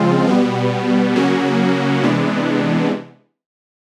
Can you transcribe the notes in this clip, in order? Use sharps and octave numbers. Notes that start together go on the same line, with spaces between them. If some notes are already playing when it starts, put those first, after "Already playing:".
Already playing: C#3 F3 G#3 C4 F4
B2 G3 B3
C#3 F#3 A#3 C#4 F#4
C3 E3 G#3 B3 D4